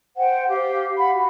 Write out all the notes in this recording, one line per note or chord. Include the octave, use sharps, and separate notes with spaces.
C5 F#5 G5
G4 F5
F#5 B5
F#4